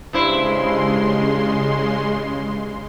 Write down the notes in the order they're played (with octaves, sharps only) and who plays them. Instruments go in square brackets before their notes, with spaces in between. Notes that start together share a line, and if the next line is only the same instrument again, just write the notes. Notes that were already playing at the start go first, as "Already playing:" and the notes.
[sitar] G2 E4 C5 [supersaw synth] C#3 G#3 C6